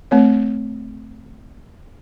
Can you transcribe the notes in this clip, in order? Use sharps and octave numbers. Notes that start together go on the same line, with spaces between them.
A3 C4 C#5